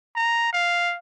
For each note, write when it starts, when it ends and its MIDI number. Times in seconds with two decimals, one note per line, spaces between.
0.16 0.53 82
0.53 0.96 77